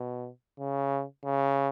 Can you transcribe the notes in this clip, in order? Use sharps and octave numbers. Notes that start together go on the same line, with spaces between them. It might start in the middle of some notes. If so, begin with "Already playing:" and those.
Already playing: B2
C#3
C#3